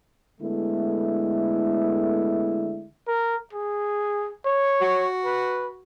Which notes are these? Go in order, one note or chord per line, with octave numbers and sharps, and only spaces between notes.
D3 G#3 A3 B3 E4
A#4
G#4
C#5
F#4
B4